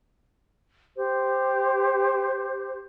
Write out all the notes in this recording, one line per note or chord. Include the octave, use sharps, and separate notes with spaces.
G4 C5